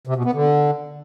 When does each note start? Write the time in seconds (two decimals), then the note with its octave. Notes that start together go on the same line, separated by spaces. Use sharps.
0.07 C3
0.16 B2
0.25 B3
0.34 D3